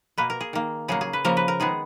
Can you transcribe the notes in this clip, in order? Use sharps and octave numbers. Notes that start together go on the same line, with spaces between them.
B2 A#3 B4
A#4
G#4
D#3 A#3
C#3 F#3 A#3 G#4
G#4
B4
C#3 F3 A#3 A#4
B4
A#4
D#3 G#3 B3 G#4